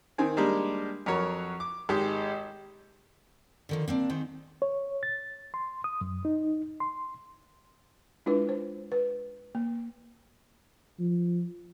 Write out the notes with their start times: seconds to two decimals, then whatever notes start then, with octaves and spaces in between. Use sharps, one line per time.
0.18 D#3 C4 G#5
0.37 G3 G#3 A#3 D4 G4
1.06 F2 F#3 A#4 C#5
1.60 D6
1.89 G#1 G#3 G4
3.69 D3 D#3 F3
3.88 A#3 C4 D4
4.10 G#2 D#3 C4
4.62 C#5
5.03 A6
5.54 C6
5.84 D#6
6.01 F#2
6.25 D#4
6.80 C6
8.26 G#3 D4 E4 F4 B4
8.49 C5
8.92 B4
9.55 A#3
10.99 F3